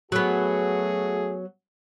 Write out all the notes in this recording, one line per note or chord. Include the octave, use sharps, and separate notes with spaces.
F#3 A3 B3 F#4 G#4